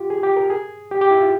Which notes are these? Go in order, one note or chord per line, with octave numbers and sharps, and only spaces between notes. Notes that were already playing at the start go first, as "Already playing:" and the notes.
Already playing: F4 G4
G#4
G4
A#4
G#4
G4
G4
E4
F4